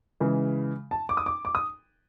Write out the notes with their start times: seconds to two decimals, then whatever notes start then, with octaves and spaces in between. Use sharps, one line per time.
0.20 C#3 E3 G#3
0.91 A5
1.09 D6
1.17 D#6
1.26 D6
1.45 D6
1.55 D#6